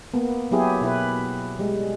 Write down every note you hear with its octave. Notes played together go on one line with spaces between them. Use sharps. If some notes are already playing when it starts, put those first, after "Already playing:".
A#3 B3
F#3 B3 E4 G4 G#4
B2 E4 B4
G3 G#3